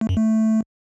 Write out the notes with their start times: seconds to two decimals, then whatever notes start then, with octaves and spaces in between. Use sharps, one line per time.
0.01 A3
0.09 F#2
0.17 A3